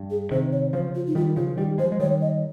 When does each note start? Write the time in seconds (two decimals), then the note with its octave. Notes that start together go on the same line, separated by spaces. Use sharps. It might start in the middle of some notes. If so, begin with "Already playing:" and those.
Already playing: G2
0.10 G#4
0.31 C3 D#3 C5
0.52 C#5
0.73 C#3 F3 C5
0.95 F4
1.07 D#4
1.15 D#3 G3 F4
1.36 C#3 F3 F4
1.57 D#3 G3 G4
1.78 F3 G#3 C5
1.92 G#3
2.00 D#3 G3 C#5
2.21 D#5